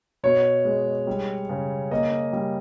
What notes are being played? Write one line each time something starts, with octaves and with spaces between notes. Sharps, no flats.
B2 C#5
G#3
G3
C#3
A#3 D#5
G3